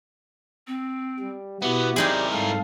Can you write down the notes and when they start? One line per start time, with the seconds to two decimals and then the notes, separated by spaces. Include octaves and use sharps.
0.67 C4
1.19 G3
1.62 B2 B3 E4 F#4 G4
1.96 C4 D#4 E4 G#4 A#4 D5
2.32 G#2 G3 A4 F5